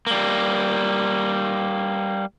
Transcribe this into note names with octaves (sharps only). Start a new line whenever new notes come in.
G3 A#3